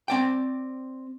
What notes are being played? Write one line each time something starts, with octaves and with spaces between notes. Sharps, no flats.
C4 D5 G5